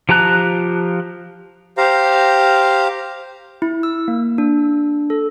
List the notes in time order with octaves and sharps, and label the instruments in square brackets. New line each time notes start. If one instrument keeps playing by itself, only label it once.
[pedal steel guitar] F3 G4 A5 A#5 F#6
[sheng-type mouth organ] G4 C5 F5 A#5
[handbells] E4
E6
A#3
D4
A4